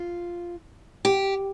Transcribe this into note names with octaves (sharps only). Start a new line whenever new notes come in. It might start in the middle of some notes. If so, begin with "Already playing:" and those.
Already playing: F4
G4